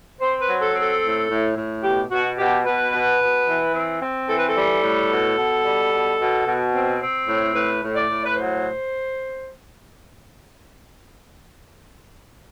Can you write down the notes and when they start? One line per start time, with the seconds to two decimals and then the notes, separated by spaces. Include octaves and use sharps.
0.21 C4 C5
0.42 B4
0.48 F#3
0.62 A4
0.75 C4
0.82 A4
1.03 A2
1.30 A2
1.57 A2
1.84 B2 G4
2.11 B2 F#4
2.38 B2 G4
2.65 B2 B4
2.93 B2
3.20 B2
3.48 E3
3.75 C4
4.02 C4
4.29 E3 A4
4.39 B4
4.49 A4
4.57 G3
4.83 A2
5.11 B2
5.38 B2
5.65 G3
5.92 B2
6.19 B2
6.47 B2
6.74 C4
7.01 C4
7.28 A2
7.55 A2 B4
7.83 A2
7.96 D5
8.10 A2
8.26 B4
8.37 F#3 C5